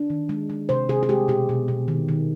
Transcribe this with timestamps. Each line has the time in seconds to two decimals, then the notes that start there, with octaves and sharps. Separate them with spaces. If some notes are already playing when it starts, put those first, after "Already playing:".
Already playing: D4
0.10 D#3
0.29 G#3
0.50 G#3
0.69 C3 C5
0.89 C3 G#4
1.03 G#4
1.09 G#3 G4
1.28 B2 G4
1.49 B2
1.68 B2
1.88 D#3
2.08 D#3